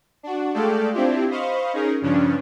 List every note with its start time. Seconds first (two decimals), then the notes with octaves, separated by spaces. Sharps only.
0.23 D4 F#4
0.54 G#3 A3 A4 D5 F5 G5
0.93 C4 D4 E4 F4 G4
1.30 C5 D#5 F5 B5 C#6
1.73 C#4 D#4 G#4 A#4
2.02 G2 C#3 F3 C#4 D4